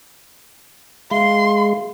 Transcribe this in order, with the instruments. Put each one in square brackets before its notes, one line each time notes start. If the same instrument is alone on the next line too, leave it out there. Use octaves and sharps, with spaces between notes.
[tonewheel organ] G#3 [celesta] E5 F5 G7 [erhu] C6